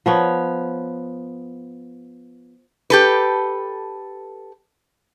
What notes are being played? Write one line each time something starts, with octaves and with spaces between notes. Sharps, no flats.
F3 B3 C#5
G4 A4 B4